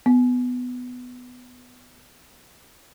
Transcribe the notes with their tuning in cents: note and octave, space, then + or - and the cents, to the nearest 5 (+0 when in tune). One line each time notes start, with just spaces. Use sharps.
B3 +10